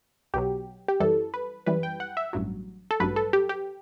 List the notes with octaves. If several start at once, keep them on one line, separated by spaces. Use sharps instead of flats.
B1 B2 F#3 G4
G4
F#2 E3 G3 A4
B4
F#2 E3 G3 B4
G5
F#5
E5
A1 G2 F#3
A4
A1 G2 F#3 B4
A4
G4
G4